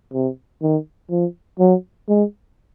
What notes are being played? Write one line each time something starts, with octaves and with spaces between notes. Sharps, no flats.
C3
D#3
F3
F#3
G#3